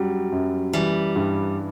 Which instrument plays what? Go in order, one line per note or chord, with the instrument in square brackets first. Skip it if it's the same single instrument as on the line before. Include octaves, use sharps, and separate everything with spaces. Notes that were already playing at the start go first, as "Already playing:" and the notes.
Already playing: [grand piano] F#2 G3 [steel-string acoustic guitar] F#3
[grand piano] F#2
[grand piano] E3 [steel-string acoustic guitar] G3
[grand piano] G2